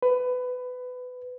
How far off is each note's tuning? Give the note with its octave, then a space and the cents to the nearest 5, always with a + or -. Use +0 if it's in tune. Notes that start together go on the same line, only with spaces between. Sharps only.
B4 +20